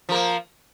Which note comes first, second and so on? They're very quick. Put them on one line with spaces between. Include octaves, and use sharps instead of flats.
F3 A#4 A#3